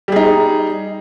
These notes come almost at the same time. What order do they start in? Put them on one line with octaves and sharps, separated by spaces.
G3 G#4 D#4